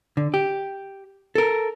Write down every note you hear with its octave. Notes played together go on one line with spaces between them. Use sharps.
D3
G4
A4 A#4